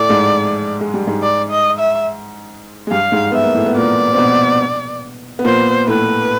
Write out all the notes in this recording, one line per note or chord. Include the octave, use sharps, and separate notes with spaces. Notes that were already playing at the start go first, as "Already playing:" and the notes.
Already playing: A2 A3 D5
G#2 G#3
G#3
G3
G#2 G#3
D5
D#5
E5
G#3
G2 G3 F5
G#2 G#3
B3 E5
A#3
A2 A3
B3
A#2 A#3 D5
C4
B2 B3
B3
A#2 A#3 C5
A2 A3 B4